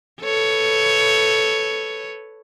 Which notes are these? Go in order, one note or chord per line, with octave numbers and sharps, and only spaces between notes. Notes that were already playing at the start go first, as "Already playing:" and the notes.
A4 B4 C#5